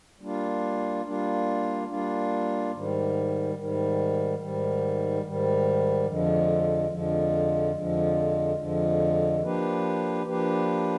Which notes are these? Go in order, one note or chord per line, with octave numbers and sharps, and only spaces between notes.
G3 A#3 D4 F4
G3 A#3 D4 F4
G3 A#3 D4 F4
G#2 D#3 G3
G#2 D#3 G3
G#2 D#3 G3
G#2 D#3 G3
F2 D3 F3 G#3
F2 D3 F3 G#3
F2 D3 F3 G#3
F2 D3 F3 G#3
F3 A#3 D4 G4 B4
F3 A#3 D4 G4 B4